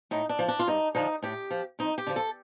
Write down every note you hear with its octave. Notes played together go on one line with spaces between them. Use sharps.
A2 D#4
D4
F3
D4
F4
G2 D#4
D3 F3 D#4
A2 G4
F3
F2 D#4
G4
D3 F3
A4